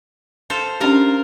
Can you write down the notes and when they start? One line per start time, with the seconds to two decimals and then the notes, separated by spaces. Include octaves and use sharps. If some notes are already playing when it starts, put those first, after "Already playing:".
0.50 A4 C5 F5
0.80 C#4 D4 F4 G4 A#4 F5